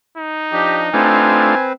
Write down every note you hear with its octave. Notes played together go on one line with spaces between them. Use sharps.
D#4
F3 D4 G4 D#5
A3 C4 D4 F4 B4 C5 G#5